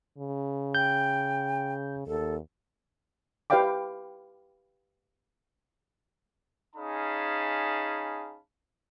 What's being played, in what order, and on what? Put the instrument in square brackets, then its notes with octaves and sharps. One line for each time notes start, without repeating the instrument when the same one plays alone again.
[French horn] C#3
[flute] G5 [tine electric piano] G6
[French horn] D#2 [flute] A4
[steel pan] G4 B4 D5 F5 G5 D6
[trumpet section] C#4 D#4 G#4 F5 A5 B5